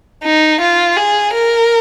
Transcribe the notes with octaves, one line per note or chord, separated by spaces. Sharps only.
D#4
F4
G#4
A#4